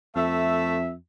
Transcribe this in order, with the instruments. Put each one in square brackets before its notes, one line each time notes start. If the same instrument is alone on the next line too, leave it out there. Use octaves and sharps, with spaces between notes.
[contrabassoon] F2 [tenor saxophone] A3 [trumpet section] E5